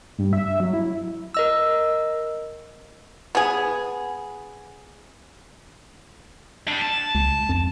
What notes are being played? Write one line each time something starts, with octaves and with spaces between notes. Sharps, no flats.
G2
E5
E5
F#3
E4
A#4 D#5 E6
B3 G#4
G3 D4
A5
C#2
F2